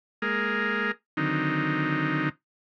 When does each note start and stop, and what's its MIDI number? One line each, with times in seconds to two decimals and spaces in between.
0.22 0.91 56
0.22 0.91 58
0.22 0.91 68
0.22 0.91 70
1.17 2.29 50
1.17 2.29 51
1.17 2.29 54
1.17 2.29 60
1.17 2.29 63